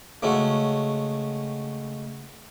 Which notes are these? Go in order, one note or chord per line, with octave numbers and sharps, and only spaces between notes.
C#3 G#3 A3 C#4 F#4